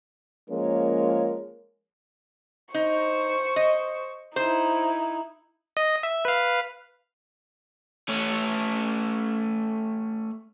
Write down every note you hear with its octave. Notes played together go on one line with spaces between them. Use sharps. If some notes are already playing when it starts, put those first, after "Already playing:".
F3 G#3 A#3 C#4 A#4 C#5
D#4 C5 C#6
D#5
D#4 E4 C5
D#5
E5
B4 F5
A3 C#4